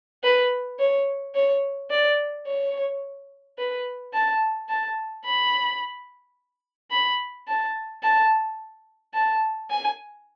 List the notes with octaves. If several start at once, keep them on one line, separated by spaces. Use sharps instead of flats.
B4
C#5
C#5
D5
C#5
B4
A5
A5
B5
B5
A5
A5
A5
G#5